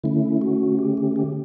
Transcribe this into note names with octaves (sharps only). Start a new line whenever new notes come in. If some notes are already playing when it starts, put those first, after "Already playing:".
D3 A3 C#4 E4
F#4
G4
G4
G4